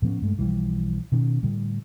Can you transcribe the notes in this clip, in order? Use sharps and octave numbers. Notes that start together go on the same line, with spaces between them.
A2 F3 B3 C#4
G2 G#3 A3
B1 E3 F3 G3
B2 D#3 C#4
A2 D3 G3